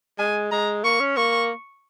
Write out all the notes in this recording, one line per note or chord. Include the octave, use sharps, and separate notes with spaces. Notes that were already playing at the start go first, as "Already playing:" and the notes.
G#3 G#5
G#3 A#5
A#3 C#6
C#4
A#3 C#6